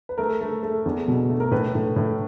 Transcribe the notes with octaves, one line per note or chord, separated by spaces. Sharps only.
B4
A3 A#4
A3
A3
E2
B2
A3
A#4
A2 B4
A2
A2